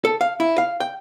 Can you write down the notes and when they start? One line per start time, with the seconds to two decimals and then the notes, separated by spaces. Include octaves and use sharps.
0.05 A4
0.21 F5
0.40 E4
0.58 F5
0.80 G5